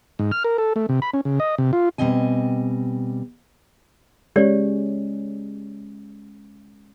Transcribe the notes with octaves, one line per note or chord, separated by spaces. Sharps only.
G#2
F6
A#4
A4
A3
C3
B5
C#4
C#3
D#5
C3
F4
B2 G3 C4 D#5 G#5
G#3 C#4 G4 C#5 D5